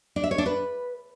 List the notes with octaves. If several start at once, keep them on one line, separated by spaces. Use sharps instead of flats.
D4
E5
C#5
D4
B4